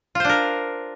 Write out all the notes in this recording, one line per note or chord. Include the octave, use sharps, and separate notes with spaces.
D4 F4 A#4 C5